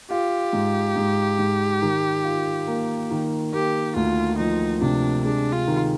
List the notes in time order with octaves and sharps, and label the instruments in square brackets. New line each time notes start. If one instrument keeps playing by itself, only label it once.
[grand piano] F4 [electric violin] G4
[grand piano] G#2
G#2
G#2
D#3
F4
A#3
D#3
[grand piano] A#3 [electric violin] G4
[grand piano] D2 [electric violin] F4
[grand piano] F3 [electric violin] D#4
[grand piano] C3 [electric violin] D4
[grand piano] G#3 [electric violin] D4
[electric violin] F4
[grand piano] D#3